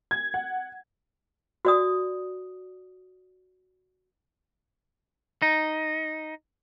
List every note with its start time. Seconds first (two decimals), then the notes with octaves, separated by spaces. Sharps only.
0.11 G#6
0.34 F#5
1.65 F#4 D5 D#6
5.42 D#4